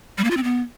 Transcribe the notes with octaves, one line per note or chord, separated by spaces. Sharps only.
G3
A#3
F4
C4
B3